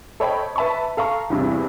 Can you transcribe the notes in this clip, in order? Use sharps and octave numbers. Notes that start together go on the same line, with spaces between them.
A4 C5 C#5 D#5 G5 B5
B4 E5 A5 B5 C#6
A4 F5 A#5 C#6
E2 G2 C3 E3